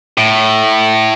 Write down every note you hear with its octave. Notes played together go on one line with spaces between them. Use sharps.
A2